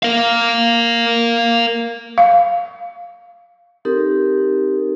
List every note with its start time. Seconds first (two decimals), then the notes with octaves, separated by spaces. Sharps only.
0.03 A#4 F5
2.18 F5
3.85 C4 D#4 G4 A4 A#4